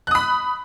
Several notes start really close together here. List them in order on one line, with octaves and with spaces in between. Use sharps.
F#6 D#6 B5